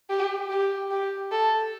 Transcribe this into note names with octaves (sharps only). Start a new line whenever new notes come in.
G4
G4
G4
A4